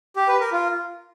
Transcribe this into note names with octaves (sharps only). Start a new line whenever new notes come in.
G4
B4
A#4
F4